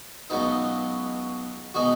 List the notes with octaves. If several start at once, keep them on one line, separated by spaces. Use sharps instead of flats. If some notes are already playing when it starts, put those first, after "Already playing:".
C#2 B2 F#3 B3 D#4
B2 G#3 D#4 F#4